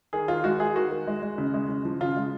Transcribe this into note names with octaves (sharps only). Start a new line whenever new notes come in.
D#3 G#4
D#3 F4
G#3 F#4
G#3 G#4
D#3 F#4
D#3
G#3
G#3
C#3
G#3
C#3
F3
C#3 F4
G#3